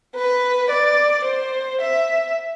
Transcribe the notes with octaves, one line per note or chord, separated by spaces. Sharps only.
B4
D5
C5
E5